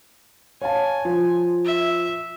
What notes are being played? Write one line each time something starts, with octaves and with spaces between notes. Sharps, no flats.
C#5 F5 G#5 A5
F3
E5